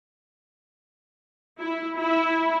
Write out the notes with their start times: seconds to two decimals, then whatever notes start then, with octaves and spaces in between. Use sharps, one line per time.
1.60 E4
1.98 E4